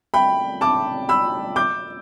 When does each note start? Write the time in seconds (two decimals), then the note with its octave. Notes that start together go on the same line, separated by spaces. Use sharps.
0.14 G5 B5
0.61 A5 D6
1.09 B5 E6
1.56 D6 G6